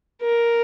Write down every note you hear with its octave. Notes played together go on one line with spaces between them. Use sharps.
A#4